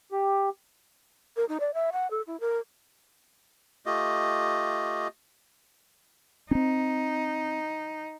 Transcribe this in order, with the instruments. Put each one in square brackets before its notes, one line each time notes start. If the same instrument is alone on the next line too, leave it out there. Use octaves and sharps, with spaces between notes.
[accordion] G4
[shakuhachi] A#4
D#4
D5
E5
F#5
A4
E4
A#4
[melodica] A3 F4 G4 D#5
[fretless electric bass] C4 C#4 [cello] D#4